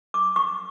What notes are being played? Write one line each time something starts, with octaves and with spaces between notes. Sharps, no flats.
D6
C#6